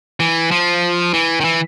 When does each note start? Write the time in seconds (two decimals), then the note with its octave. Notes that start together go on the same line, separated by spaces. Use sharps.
0.20 E3
0.51 F3
1.13 E3
1.40 D#3
1.44 E3